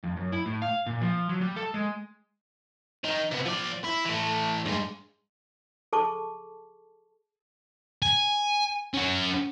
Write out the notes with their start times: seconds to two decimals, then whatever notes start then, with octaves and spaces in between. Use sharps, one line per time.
0.03 F2
0.17 F#2
0.32 E4
0.46 A2
0.62 F5
0.86 A#2
1.01 F3
1.29 F#3
1.41 G3
1.56 A4
1.74 G#3
3.04 D#3 D#4
3.31 C3 B3
3.45 F3 D5
3.84 E4
4.05 E3 A3
4.66 G2 G#3
5.93 G#4 A4 A5 C#6 D6
8.02 G#5
8.94 C#4 F#4